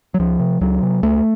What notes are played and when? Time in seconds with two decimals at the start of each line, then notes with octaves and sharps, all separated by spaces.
0.14 F#3
0.19 C#2 F3
0.40 C3
0.61 C#2 F#3
0.82 C3
1.03 C#2 A3